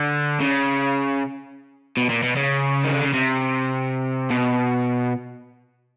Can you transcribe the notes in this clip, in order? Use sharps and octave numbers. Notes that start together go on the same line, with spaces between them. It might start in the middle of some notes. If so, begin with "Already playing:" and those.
Already playing: D3
C#3
B2
A#2
B2
C#3
D#3
D3
C#3
C3
B2